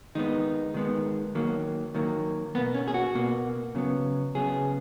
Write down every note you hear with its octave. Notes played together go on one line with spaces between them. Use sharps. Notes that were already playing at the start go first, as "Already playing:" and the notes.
D#3 G#3 B3 D#4
D#3 G#3 B3
D#3 F#3 A#3
D#3 F#3 A#3
B2 A#3 B3
C#4
G#4
F#4
B2 A#3
C#3 F#3 B3
C#3 F#3 B3 G#4